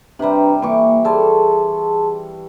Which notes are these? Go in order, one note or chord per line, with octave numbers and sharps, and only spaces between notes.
C3 G3 D4 B4 A#5
E3 A#3 C#6 D6
G3 G#4 A4 A5 C6